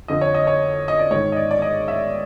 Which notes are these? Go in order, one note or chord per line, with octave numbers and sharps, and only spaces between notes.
F2 D3 F3 D#5
C#5
D#5
C#5
D#5
D5
G#2 D#3 C#5
D#5
D5
D5
D#5
E5